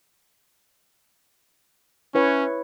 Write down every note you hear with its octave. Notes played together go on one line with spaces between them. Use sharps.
C#4 E4 B4 C#5